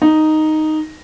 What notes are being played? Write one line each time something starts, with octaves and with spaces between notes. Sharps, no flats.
D#4